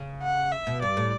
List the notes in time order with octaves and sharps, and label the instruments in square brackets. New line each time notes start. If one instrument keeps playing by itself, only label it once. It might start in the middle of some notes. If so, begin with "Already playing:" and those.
Already playing: [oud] C#3
[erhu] F#5
E5
[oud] B2
[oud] G2 [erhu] D5
[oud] A2